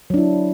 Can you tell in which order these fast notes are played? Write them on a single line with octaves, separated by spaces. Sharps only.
F#3 D4 E4